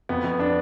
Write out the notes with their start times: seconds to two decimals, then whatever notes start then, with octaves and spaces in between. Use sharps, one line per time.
0.09 F2 B3
0.24 F2
0.39 D4